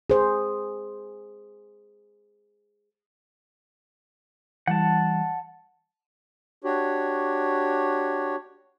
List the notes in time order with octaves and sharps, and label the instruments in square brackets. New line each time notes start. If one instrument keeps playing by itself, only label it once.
[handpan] G#4 C5
[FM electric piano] E3 G3 [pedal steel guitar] F#5 A5
[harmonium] D4 F#4 G4 C#5